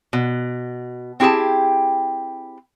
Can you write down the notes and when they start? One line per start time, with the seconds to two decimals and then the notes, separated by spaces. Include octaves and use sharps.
0.13 B2
1.20 C4 E4 G4 G#4 A5